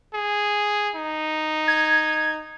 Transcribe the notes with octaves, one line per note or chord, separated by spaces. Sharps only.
G#4
D#4
G#6